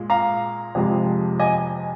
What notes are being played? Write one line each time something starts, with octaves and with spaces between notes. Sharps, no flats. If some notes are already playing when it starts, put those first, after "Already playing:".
Already playing: A#2 G#3
F5 A#5
F2 C3 F3 G#3
D#5 G#5